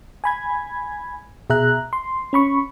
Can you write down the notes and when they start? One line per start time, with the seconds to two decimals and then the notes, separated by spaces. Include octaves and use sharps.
0.24 G#5 B5 G#6
1.50 B2 G#4 E5 A#5 F#6
1.93 C6
2.33 C#4 B5 C#6